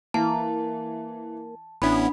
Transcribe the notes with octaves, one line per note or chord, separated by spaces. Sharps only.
E3 A#3 A5
A1 B3 C#4 D4 E4 B5